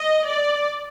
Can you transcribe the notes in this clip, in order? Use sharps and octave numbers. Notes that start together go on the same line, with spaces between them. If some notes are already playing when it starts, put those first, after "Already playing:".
Already playing: D#5
D5